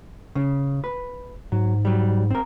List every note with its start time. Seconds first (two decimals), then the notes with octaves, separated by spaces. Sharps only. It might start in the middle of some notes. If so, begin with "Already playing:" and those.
0.35 C#3
0.84 B4
1.52 G#2 F#3
1.85 F#3 G3
2.31 C4 A#4